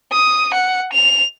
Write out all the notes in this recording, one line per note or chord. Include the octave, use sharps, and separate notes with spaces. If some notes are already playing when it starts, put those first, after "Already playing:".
D#6
F#5
F7